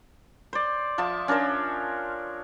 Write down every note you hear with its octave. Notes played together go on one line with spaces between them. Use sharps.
C5 D5
F3 E5 A5
C#4 D4 A#4 C5